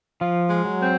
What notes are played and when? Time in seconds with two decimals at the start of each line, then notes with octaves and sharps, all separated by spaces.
0.21 F3 F4
0.50 G#3
0.65 F#3
0.80 C4